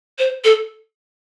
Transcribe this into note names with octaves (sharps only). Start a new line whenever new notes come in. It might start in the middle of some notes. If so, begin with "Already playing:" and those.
C5
A4